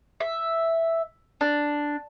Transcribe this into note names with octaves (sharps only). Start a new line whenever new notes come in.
E5
D4